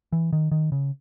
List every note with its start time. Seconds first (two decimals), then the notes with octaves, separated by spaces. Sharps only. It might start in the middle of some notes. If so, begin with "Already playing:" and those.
0.12 E3
0.33 D#3
0.52 D#3
0.72 C#3